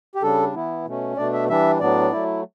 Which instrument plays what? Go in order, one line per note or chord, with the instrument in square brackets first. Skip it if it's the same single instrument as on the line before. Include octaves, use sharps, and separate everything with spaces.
[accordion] G4
C#3 G3 D4 A4
E3 B3 E4
B2 A3 C#4
B2 A3 D4 D5
E5
E3 G3 D4 E5
A2 F#3 B3 D4 D5
F#3 A3 E4